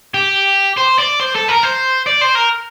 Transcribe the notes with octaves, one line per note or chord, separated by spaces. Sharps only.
G4
C5
D5
C5
A4
A#4
C5
D5
C5
A#4